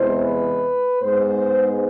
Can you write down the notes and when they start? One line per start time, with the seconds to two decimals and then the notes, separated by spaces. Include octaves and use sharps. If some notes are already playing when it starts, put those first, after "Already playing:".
Already playing: E2 C3 E3 G#3 C5
0.23 B4
1.01 G#2 G#3 B3 C5